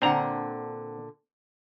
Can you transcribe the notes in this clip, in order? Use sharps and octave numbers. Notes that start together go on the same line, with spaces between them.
A#2 D3 C4 D4 F#5 A#5